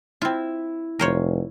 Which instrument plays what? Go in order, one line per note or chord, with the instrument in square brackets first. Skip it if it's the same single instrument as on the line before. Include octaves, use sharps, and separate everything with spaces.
[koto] C4 F4 [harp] E4
[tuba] F1 [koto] A#4 C5 C#5